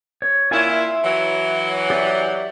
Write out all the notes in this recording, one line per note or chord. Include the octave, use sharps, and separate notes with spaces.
C#5
A#2 E4 F4 C#5 G#5
E5 C6
E3 F#3
G4 D5 E5